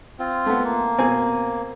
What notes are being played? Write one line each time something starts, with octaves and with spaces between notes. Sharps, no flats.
C4 F4
A3 B3
A#3
B2 C4 G#5